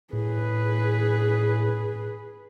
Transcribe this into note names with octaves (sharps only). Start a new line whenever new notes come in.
A2 G#4 B4